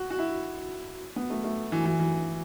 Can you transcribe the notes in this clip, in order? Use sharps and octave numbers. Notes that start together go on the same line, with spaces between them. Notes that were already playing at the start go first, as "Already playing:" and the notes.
Already playing: F#4
F#4
E4
B3
A3
A3
E3
E3
E3